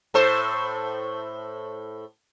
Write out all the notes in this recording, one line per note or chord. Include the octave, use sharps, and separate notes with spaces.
A2 A4 C5